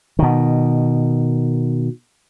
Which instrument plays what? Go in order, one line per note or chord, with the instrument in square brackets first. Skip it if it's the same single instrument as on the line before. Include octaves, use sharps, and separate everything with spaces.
[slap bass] B2 D#3